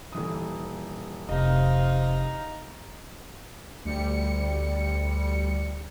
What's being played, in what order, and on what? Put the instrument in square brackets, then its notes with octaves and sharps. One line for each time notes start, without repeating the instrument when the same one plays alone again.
[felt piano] D#1 E3 D#6
[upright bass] F1 [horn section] C3 F5 [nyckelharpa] D#4 A#5 [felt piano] D#5
[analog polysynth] D2 G3 C#7